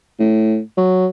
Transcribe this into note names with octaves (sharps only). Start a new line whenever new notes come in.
A2
F#3